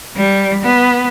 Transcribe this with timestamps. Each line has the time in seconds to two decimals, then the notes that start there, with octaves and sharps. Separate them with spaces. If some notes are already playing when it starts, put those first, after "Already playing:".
0.16 G3
0.63 B3